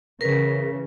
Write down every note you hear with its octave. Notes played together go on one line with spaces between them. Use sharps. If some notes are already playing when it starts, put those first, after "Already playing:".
C#3 E3 A#4 B4